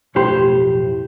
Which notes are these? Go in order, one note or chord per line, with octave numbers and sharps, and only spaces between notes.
B1 F2 A2 G4 C5 B5